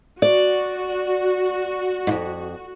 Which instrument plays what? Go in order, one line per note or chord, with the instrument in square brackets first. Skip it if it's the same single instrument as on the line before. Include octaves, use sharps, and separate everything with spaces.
[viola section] F#4 [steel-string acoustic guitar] D5
[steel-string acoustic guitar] F2 G#2